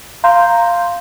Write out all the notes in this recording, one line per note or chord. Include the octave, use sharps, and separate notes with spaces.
F5 A#5 C6 G6